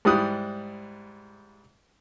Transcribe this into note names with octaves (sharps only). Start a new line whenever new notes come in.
G#2 G3 E4 D#6 F#6